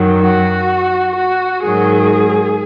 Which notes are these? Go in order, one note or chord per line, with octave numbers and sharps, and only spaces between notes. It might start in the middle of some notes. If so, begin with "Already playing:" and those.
Already playing: F#2 D#3 F#3
F#4
F#4
G#2 D#3 F#3 G#4